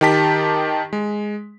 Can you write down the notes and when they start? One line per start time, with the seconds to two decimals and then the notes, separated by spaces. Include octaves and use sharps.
0.01 D#3 D#4 G4 A5 B6
0.93 G#3